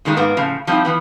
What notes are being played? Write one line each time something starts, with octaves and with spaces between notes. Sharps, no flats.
A#2 D#3 G3 G#3 D#4
G#2 A#3 B3
A2 C#3 F3
F3 G3 C4 D#4 E4
E3 F3 B3